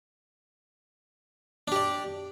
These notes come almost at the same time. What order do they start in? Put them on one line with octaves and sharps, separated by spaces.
D4 G4 D5